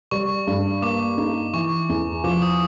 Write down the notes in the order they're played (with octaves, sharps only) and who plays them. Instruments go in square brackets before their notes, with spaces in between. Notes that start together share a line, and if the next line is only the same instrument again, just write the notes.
[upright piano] G3 [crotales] C#6
[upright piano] G2
[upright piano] A#3 [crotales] D6
[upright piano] D#4
[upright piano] E3 [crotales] C#6
[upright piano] E2
[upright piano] F3 [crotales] D6
[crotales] D#6